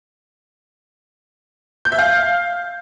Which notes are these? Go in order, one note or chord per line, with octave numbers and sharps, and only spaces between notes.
G6
E5
F5